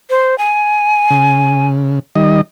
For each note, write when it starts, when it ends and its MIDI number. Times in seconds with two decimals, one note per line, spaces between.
0.10 0.38 72
0.38 1.67 80
1.10 1.99 49
2.15 2.41 51
2.15 2.41 55
2.15 2.41 75